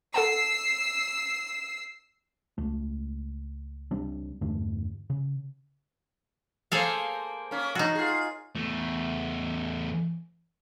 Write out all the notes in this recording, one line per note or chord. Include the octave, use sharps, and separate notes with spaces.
A4 F#5 A5 E6 C7
C#2 A3
C#2 G3 C4 D4
E2 G2 D3 A3
C#3
A#3 G#4 A4 C5 F5
A#3 C#4
F3 D#4 F#4
F4 G#4
E2 A3